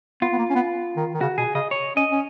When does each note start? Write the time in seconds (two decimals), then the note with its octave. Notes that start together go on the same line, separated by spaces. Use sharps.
0.22 B3 F4
0.33 B3
0.38 A#3
0.50 C#4
0.55 B3
0.97 D#3
1.14 D#3
1.21 C#3 F#4
1.38 B2 G#4
1.55 C#3 D#5
1.71 C#5
1.96 C#4 D#5
2.12 C#4